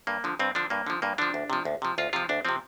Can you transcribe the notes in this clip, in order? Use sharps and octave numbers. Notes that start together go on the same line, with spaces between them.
G2 A#3
D3 F3
G2 C4
D3 F3 D4
G2 A#3
D3 F3
G2 A#3
D3 F3 D4
D2
C3 F3
D2
C3 F3
D2 F4
C3 F3 F4
D2 D4
C3 F3 C4